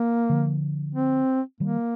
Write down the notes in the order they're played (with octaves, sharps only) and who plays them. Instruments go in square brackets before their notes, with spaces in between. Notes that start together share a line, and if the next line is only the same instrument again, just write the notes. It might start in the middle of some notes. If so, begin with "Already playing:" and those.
Already playing: [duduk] A#3
[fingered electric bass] D3 F3
[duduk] C4
[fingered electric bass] D#3 G3 [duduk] A#3